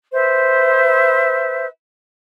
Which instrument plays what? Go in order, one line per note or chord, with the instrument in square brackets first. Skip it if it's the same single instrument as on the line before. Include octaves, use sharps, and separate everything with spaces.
[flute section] B4 C5 E5